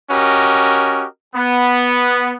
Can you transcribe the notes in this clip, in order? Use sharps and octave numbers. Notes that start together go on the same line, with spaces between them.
C#4 F#4 G4 A#4 D#5
B3